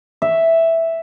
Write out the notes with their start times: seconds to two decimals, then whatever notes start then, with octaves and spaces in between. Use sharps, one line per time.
0.22 E5